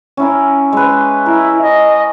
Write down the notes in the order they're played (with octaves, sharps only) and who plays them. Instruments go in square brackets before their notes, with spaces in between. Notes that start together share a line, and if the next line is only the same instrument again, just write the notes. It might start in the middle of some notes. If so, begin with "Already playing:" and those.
[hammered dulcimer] C#4 E4 A#4
G#3 B4
[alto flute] E4 [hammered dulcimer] A#4
[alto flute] D#5